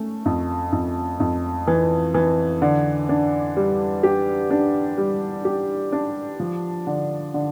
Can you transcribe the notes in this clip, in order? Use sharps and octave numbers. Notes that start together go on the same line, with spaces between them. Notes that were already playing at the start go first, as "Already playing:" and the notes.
Already playing: A3 C#4
F2
F2
F2
E3
E3
D3
D4
G3
G4
D4
G3
G4
D4
F3
D3
D3